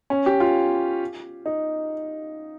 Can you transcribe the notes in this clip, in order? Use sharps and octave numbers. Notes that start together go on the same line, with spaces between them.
C#4
G4
F4
D#4